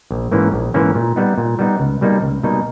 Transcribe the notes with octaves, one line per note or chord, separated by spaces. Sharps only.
A#1
G#2 E3 A#3 C#4
A#1
G#2 E3 A#3 C#4
A#2
G3 B3 D#4
A#2
G3 B3 D#4
C#2
B2 G3 A#3 D#4
C#2
B2 G3 A#3 D#4